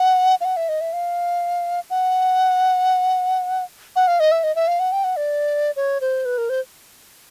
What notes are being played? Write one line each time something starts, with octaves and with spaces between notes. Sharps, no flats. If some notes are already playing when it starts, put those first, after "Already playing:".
Already playing: F#5
F5
F#5
E5
D#5
E5
F5
F#5
F#5
F5
D#5
E5
D#5
E5
F5
F#5
G5
F#5
D5
C#5
C5
B4
A#4
C5